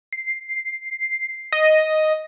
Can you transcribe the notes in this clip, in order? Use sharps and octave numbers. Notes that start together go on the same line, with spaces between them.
C7
D#5